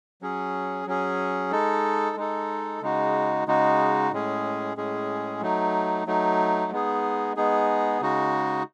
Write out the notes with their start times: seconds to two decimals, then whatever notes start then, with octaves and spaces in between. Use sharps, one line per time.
0.22 F#3 C#4 G#4
0.87 F#3 C#4 G#4
1.52 G#3 D#4 A4
2.16 G#3 D#4 A4
2.82 C#3 G#3 D#4 F#4
3.46 C#3 G#3 D#4 F#4
4.12 A2 G#3 C#4 G#4
4.77 A2 G#3 C#4 G#4
5.42 F#3 A3 D#4
6.07 F#3 A3 D#4
6.72 G#3 B3 D#4 G#4
7.36 G#3 B3 D#4 G#4
8.01 C#3 G#3 D#4 F#4